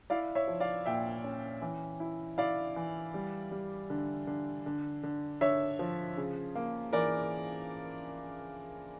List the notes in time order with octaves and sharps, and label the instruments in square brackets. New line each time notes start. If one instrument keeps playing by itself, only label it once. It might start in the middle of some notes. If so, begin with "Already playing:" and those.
[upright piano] E4 D5 F5
C#5 E5
F3
D5 F5
A#2 E5 G5
C#4
E3
E4
E4 D5 F5
E3
G3
G3
D3
D3
D3
D3
D3 C#5 E5
F3
C#3
A#3
E3 A#4 D5